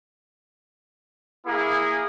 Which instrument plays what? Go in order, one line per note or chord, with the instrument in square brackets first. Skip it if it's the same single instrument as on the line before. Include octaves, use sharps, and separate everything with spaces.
[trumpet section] A#3 E4 G#4